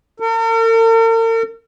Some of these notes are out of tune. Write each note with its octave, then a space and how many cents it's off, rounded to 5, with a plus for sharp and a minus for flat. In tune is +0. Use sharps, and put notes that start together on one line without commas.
A#4 -45